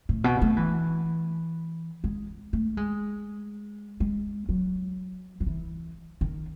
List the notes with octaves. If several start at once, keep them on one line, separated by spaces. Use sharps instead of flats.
A2
B2
A3
E3
G#3
A3
G#3
G#3
F#3
F#3
E3
D#3